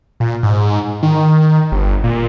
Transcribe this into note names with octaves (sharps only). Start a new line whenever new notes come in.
A#2
G#2
D#3
G1
A#2